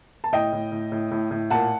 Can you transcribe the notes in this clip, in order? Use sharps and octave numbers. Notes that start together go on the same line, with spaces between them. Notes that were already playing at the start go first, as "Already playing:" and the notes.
A5
A2 D#5 G5
A2
A2
A2
A2
A2
A#2 F#5 A5